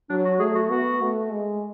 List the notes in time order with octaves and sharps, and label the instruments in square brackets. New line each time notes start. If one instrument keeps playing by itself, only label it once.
[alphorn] F#3 [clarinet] D4
[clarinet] F#4
[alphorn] A3 [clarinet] G#4
[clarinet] F#4
[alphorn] B3 [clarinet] F#4
[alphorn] A3
G#3